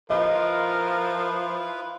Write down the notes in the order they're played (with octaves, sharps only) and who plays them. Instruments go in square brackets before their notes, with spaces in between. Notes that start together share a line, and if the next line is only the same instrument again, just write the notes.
[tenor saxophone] F3 [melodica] E4 F4 B4 [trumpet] A#4 [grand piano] D#5